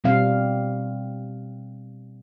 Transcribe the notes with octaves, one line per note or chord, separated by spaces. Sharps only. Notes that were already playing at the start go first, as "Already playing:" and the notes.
B2 G3 C4 F5